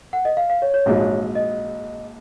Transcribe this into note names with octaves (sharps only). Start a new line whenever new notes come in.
F#5
D#5
F5
F5
C#5
C#5
A#1 G#2 F#3
D#5